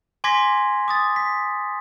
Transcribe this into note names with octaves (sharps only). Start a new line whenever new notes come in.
G#5 C6 D6 G#6 A#6 B6
D6 D#6 A6
B6